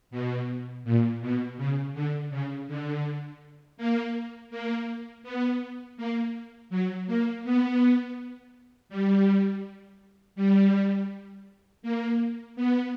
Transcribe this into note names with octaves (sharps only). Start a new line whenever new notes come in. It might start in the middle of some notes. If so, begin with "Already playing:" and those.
B2
A#2
B2
C#3
D3
C#3
D3
A#3
A#3
B3
A#3
F#3
A#3
B3
G3
G3
A#3
B3